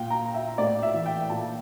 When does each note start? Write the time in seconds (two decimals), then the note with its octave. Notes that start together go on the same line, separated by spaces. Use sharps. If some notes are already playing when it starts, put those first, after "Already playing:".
Already playing: A#2 G5
0.10 A#5
0.34 E5
0.58 A2 D5
0.83 E5
0.94 E3
1.06 G5
1.30 A#2 A5